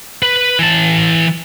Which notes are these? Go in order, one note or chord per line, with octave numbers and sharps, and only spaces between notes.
B4
E3 A5